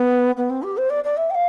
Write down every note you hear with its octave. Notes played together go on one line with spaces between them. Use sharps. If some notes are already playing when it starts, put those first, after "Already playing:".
Already playing: B3
B3
C4
G4
C5
D5
D5
E5
G5
F5